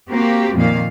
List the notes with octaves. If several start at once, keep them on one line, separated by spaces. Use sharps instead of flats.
A#3 C4 F#4 G4
F2 A#2 D#3 A#3 F5